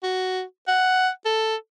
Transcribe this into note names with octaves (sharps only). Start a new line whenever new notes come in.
F#4
F#5
A4